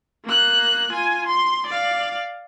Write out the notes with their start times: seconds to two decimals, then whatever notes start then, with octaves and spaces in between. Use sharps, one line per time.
0.25 A#3 F#6
0.91 F4 G#5
1.26 C6
1.67 D5 F5